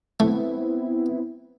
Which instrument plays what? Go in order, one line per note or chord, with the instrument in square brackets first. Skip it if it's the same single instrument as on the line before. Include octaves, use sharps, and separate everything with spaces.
[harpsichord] A3 [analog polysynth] B3 C4 E4